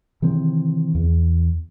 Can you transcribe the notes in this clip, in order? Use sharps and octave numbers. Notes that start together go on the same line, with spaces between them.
C3 D#3 E3 C4
E2